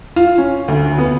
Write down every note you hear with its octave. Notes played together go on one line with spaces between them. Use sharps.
F4
C#4
D2
B3